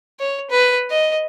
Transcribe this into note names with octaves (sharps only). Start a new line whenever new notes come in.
C#5
B4
D#5